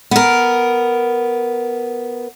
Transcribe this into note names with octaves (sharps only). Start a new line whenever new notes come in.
B3 A#4